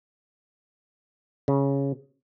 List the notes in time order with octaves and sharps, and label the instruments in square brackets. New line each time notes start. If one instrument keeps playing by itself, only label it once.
[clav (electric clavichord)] C#3